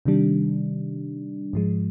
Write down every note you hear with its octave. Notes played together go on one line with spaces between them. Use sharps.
C3 D#3 G3 D4
G#2 F3 G#3